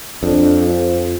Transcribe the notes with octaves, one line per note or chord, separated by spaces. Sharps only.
F2 D4
F3